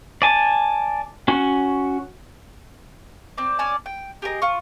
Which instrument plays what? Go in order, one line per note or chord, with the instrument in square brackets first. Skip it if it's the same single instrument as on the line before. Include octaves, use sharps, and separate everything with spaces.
[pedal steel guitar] D5 G#5 A5
C#4 F#4
[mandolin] C4 D5
C#4 D5 G#5 A5
G5
G4 G#4 A#4 D#5
F4 C#6